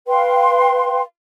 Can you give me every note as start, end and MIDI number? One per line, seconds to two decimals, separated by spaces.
0.07 1.01 71
0.07 1.01 77
0.07 1.01 79
0.07 1.01 84